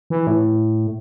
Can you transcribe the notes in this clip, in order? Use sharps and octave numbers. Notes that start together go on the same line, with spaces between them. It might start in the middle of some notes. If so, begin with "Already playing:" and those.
E3
A2